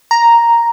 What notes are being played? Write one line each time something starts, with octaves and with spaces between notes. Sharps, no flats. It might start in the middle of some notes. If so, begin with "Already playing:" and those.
A#5